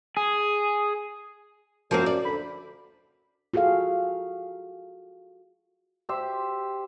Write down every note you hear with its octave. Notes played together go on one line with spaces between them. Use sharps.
G#4
F#2 F3 A#3 C4
D5
D2 D3 B5
F4 F#4 G#4 A4 F5
G4 C5 E5